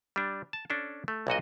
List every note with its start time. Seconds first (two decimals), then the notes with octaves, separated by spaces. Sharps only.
0.16 G3 D4
0.53 A5
0.70 C#4 D4 A4
1.08 A3
1.27 B1 A#2 F#4 D#5